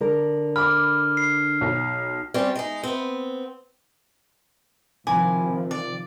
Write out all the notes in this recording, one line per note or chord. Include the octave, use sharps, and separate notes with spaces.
D3 A#4
B5 D6 F6
C7
B1
G3 C4 C#4 G4
G#3 D#4
B3 C4
C3 D#3 F3 E4 G#5 D6
D5